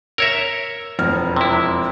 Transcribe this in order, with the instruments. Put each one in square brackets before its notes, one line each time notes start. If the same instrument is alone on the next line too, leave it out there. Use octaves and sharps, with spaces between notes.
[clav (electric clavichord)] A#4 C#5 E5 [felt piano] E6 A#6
[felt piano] E1 F2 F6
[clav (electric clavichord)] C3 E4